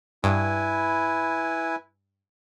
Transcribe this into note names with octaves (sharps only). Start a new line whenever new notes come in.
G2 E4 B4 G#5